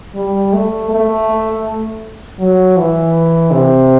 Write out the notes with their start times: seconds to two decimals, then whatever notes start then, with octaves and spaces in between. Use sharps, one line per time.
0.15 G3
0.53 A3
0.90 A3
2.39 F#3
2.77 E3
3.51 C3